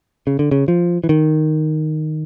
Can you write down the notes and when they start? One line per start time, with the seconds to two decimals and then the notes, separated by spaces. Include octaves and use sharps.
0.27 C#3
0.39 D3
0.51 C#3
0.68 F3
1.04 E3
1.09 D#3